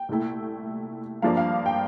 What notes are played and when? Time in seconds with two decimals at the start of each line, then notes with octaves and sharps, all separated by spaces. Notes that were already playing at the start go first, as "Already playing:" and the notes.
Already playing: G5
0.09 C2 A#2 A3 E4
1.22 G2 F3 A#3 D4 F5
1.37 F5
1.66 G5